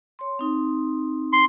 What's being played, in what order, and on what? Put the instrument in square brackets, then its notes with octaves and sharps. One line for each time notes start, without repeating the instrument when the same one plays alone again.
[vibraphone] C#5 C6
C4 D#4
[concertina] C6